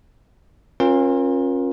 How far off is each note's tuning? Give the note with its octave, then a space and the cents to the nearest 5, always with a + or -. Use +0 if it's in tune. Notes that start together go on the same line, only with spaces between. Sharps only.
C#4 -35 F4 +25 A#4 +30